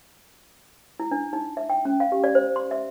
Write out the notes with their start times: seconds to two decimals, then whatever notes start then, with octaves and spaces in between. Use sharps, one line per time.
1.00 E4
1.11 D4
1.33 D#4
1.57 E5
1.70 G5
1.85 C#4
2.00 F5
2.12 G4
2.24 D5
2.35 C5
2.56 C6
2.71 E5